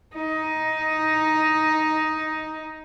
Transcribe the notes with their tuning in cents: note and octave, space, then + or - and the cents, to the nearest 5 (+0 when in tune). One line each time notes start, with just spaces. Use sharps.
D#4 +5